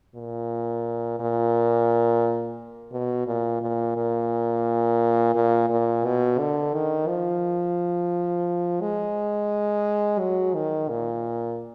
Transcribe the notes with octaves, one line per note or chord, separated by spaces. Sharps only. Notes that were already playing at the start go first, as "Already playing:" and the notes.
A#2
A#2
B2
A#2
A#2
A#2
A#2
A#2
B2
D3
D#3
F3
G#3
F#3
D#3
A#2